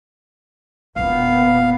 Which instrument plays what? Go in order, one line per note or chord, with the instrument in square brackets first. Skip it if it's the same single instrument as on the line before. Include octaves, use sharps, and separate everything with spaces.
[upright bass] E1 E2 [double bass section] A#2 B3 [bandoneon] F5